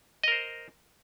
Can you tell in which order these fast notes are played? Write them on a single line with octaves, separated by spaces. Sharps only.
D#5 A#4 C5